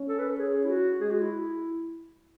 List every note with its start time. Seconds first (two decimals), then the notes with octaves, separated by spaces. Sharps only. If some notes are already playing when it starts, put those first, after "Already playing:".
Already playing: C#4
0.09 A4
0.19 B4
0.29 A4
0.39 G#4
0.65 E4
0.70 F#4
1.00 G#3 G#4
1.11 F#4
1.22 E4